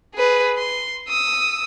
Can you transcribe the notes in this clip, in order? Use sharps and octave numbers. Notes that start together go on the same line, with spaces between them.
G#4 B4
C6
D#6 E6